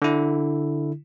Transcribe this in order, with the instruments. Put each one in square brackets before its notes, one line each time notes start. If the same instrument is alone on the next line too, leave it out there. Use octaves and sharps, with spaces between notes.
[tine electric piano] D3 E4